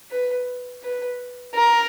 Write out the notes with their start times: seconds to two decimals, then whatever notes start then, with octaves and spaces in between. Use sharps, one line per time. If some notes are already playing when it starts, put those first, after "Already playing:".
0.11 B4
0.83 B4
1.54 A#4